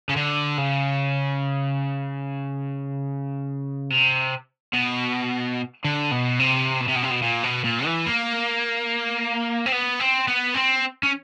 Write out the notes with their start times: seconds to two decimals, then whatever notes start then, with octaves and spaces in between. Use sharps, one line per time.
0.09 C#3
0.16 D3
0.58 C#3
3.90 C3
4.73 B2
5.85 D3
6.11 B2
6.39 C3
6.81 B2
6.89 C3
6.96 B2
7.04 C3
7.11 B2
7.23 A#2
7.44 B2
7.64 A#2
7.85 E3
8.06 A#3
9.66 C4
9.72 B3
10.00 C4
10.28 B3
10.54 C4
11.03 C#4